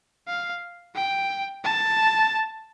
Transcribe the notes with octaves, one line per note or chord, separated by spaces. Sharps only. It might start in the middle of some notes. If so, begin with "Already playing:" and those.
F5
G5
A5